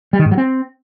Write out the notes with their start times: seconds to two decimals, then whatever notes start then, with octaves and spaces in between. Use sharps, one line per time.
0.13 G3
0.19 D#3
0.25 G#2
0.31 F#3
0.38 C4